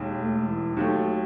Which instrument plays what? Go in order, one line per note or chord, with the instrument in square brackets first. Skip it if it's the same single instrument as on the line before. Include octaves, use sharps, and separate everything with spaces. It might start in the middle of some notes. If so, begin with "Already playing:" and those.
Already playing: [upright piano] E1 D#2 D#3
[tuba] A3
E3
[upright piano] D#2 D#3 A3 [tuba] F#3